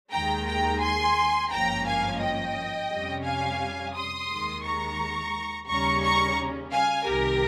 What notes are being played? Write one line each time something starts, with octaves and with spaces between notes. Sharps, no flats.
D#2 D#3 G#3 G5 A#5
G5 A#5
G#5 C6
G#1 G2 F3 A#3 C#4 G5 A#5
F5 G#5
D#5 G5
F2 C3 G3 C#4
F5 G#5
C6 D#6
D#2 D#3 G#3
A#5 C#6
D#2 C#3 G3 C#4 A#5 C#6
A#5 C#6
F5 G#5
C2 C3 D#3 G4 A#4